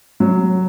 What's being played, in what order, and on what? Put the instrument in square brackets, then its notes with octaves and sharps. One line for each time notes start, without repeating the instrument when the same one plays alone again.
[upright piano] F#3